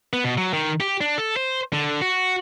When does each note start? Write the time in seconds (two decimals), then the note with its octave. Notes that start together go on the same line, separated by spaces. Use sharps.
0.13 B3
0.24 B2
0.37 F#3
0.53 D#3
0.80 G4
1.01 D4
1.18 A4
1.36 C5
1.73 D3
2.02 F#4